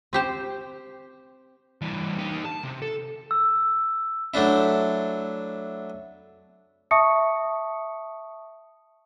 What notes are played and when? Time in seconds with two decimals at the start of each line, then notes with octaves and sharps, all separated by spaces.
0.13 C4 G4 C5
1.82 E3 G3
2.18 D#4 G4
2.45 A5
2.64 C3
2.82 A4
3.31 E6
4.34 F#3 A3 D4 E4
6.91 E5 A5 C#6 D#6 C#7